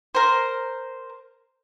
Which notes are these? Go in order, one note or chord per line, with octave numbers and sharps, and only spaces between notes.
A#4 C5